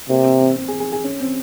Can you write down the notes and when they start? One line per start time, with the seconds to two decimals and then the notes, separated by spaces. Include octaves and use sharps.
0.09 C3 A#3
0.24 C4
0.41 C4
0.56 C4
0.68 G#4
0.80 G#4
0.92 G#4
1.04 C#4
1.20 C4